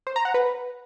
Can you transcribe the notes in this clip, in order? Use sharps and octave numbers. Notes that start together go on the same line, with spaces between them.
C5
A#5
F#5
B4